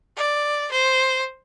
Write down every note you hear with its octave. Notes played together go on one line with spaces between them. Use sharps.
D5
C5